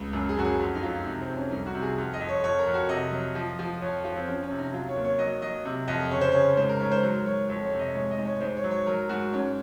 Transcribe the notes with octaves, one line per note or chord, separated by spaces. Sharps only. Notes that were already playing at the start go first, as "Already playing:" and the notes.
Already playing: C#2
F#2
G#4
F#2 F#4
G#4
F2
D#4
F#3 F4
C3 D#4
C4
F2
C#4
C2 D#4
F#4
C3
G#4
F2
D#5
F2
C#5
F2 C#5
A#4
F2
F#4
C3 D#5
F#3
F3
F3
F2 C#5
F3 F4
C4
F3 C#4
C#4
C3
D#4
F#3 F4
C#5
D#2
C#5
F#3 D#5
F#3 D#5
C3
F2 D#5
C#3 C#5
C5
C#3 C#5
G#2 C5
A#4
G#2 C#5
C5
F#3 A#4
F#3 C#5
F2 C#5
C#5
C3
D#5
G#2 C#5
D#5
G#2
C#5
G#2 C5
C#5
F#3
C#5
F#3 A#4
G#2 F#4
G#2 C#4